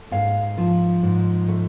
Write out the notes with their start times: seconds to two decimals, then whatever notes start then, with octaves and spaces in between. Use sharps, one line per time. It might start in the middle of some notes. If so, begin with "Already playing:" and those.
Already playing: A3
0.11 G#2 F5
0.58 F3
1.03 G#2
1.48 A3